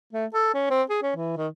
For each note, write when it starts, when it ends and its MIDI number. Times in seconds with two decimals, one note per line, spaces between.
0.13 0.25 57
0.34 0.50 69
0.54 0.68 61
0.70 0.82 60
0.90 0.99 68
1.03 1.11 61
1.16 1.32 52
1.37 1.47 51